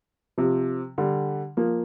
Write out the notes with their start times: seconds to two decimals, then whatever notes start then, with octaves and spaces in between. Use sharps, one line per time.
0.38 C3 F3
0.98 D3 G3
1.57 F3 A#3